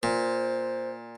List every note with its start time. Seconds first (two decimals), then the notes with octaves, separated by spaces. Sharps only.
0.03 A#2 C5